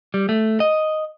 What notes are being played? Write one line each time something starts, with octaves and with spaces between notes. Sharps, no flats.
G3
A3
D#5